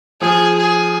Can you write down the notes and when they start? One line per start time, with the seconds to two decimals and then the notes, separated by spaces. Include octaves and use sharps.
0.21 F3 G#4
0.58 G#4